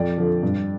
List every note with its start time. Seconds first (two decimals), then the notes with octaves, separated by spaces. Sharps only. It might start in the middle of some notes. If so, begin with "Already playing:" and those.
Already playing: F2 D5
0.18 D3 F3
0.43 G2